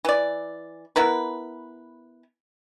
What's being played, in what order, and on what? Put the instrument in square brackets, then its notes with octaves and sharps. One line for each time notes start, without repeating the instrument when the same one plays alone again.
[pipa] E3 D5
B3 E4 A#4 B4